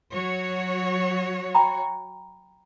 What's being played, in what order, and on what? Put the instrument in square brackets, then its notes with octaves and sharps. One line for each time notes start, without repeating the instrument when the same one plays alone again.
[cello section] F#3 F#4 C#5
[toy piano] G5 A#5 B5